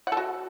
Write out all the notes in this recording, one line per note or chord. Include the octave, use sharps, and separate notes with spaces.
F#5
A4
F#4